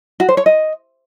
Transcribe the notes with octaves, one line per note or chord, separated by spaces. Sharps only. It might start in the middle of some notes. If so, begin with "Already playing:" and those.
F#4
C5
C#5
D#5